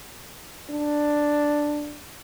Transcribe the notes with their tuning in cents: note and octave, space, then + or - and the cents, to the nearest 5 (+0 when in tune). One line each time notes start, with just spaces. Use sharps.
D4 +5